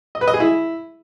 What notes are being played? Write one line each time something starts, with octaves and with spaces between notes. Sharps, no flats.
D#5
B4
D#5
G#4
E4